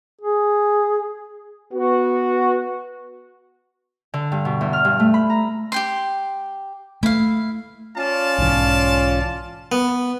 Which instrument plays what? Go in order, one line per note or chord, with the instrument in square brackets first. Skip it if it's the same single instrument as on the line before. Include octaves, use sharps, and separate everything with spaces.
[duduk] G#4
[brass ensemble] B3 F#4
[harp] D3
G2
B2
E2
F6
G2
A3
B5
A#5
[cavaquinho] G4 G5 C6
[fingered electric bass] A3 [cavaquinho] E4 F5
[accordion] C#4 F4 [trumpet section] D5 F5 A5
[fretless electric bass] B1 G#2 E3
[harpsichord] B3